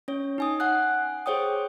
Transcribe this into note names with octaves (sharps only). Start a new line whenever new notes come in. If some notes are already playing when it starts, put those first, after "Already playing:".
C#4 C#5
D#4 G#5 D#6
F#5 G#5 F#6
G#4 C5 C#5 G5 D#6